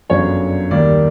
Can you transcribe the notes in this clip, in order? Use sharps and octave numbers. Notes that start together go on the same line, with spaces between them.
G1 F#2 D3 F#3 C#5
D#2 D#3 G3 A#3 D5